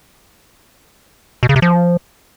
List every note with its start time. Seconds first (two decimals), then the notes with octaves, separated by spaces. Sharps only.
1.43 B2
1.49 C#3
1.56 C3
1.62 F3